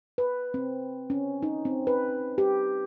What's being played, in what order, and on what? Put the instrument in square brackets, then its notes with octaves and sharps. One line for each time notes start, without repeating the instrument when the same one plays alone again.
[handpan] B4
C4
C#4
D#4
C4
B4
G4